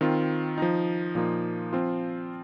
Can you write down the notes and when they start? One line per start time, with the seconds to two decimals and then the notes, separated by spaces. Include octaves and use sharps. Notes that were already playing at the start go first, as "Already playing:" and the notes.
0.01 D#3 C4 F4
0.58 F3 D#4
1.15 A#2 F3 A#3 D#4
1.73 F3 C4 F4